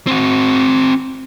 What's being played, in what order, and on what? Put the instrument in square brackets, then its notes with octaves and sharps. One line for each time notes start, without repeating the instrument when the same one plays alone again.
[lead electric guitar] C4 F#4